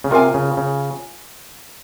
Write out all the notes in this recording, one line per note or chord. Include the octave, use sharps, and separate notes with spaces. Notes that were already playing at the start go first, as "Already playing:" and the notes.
C#3
C3 F4 A#4 F5 G#5
C#3
C#3